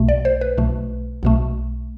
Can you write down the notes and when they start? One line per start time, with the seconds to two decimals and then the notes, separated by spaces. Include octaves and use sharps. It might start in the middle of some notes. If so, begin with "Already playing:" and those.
Already playing: B1 B2 A3
0.09 D5
0.25 C5
0.41 B4
0.58 B1 B2 A3
1.23 B1 B2 A3